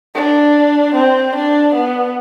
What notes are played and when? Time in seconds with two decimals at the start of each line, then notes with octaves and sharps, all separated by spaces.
0.15 D4
0.95 C4
1.35 D4
1.75 B3